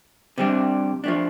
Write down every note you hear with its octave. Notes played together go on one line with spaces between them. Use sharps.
C3 G3 D4
F3 A3 D4